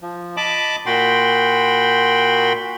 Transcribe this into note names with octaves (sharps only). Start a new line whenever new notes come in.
F3
D#5 A5 B5 D6
A#2 F#4 G5 B5 C6